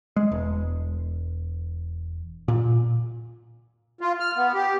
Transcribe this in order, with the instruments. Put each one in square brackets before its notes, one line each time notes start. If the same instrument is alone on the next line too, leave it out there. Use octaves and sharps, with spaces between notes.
[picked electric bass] G#3
E1
A#2
[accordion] F4
F6
B3
G4